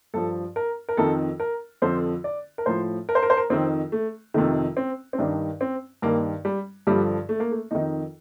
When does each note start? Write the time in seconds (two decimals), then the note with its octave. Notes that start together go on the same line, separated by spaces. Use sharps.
0.14 G2 F3 A4
0.56 A#4
0.89 A#4
0.97 F2 D#3 A4
1.40 A#4
1.82 F2 D3 F3 C5
2.24 D5
2.58 A#4
2.66 A2 F3 C5
3.09 A#4
3.15 C5
3.23 A#4
3.30 C5
3.37 A#4
3.50 F2 D#3 C4
3.92 A3
4.34 F2 C3 D#3 A3
4.77 C4
5.13 C4
5.19 G2 D#3 D4
5.61 C4
6.02 G2 D#3 A#3
6.45 G3
6.87 G2 D3 F3 G3
7.29 A3
7.40 A#3
7.51 A3
7.71 F2 D#3 D#4